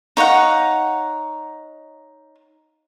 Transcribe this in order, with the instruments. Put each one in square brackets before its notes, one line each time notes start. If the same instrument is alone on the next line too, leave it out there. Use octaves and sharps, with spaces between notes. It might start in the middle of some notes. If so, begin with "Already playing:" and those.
[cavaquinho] D#4 C#5 F5 F#5